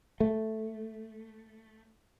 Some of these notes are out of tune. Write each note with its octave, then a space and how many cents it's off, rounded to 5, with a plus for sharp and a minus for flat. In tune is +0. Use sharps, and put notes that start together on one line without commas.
A3 +0